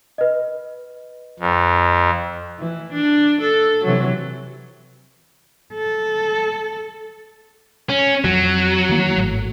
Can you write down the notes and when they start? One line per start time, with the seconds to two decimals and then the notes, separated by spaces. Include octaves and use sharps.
0.18 B4 D#5
1.39 F2
2.59 E3
2.93 D4
3.42 A4
3.85 C3 E3 F#3
5.74 A4
7.89 C#4
8.24 F2 F#3
8.89 D#3 E3 A#3
9.17 G#1 A2